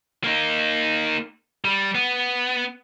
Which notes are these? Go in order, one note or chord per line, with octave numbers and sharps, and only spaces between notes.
A#3 D#4
G3
B3